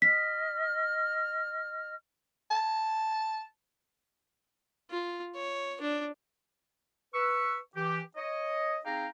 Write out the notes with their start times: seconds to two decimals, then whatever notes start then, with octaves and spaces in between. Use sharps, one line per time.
0.02 D#5 F6 B6
2.50 A5
4.90 F4
5.35 C#5
5.81 D4
7.14 B4 C#6 E6
7.76 E3 G4
8.15 C#5 D#5
8.85 C4 D#4 G#4 F5 G5 A#5